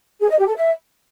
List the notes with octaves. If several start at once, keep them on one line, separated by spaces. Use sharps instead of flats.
G#4
D#5
G4
A4
E5